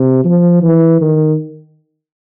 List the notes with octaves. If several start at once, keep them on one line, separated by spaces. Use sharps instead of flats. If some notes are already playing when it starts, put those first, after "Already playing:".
Already playing: C3
F3
E3
D#3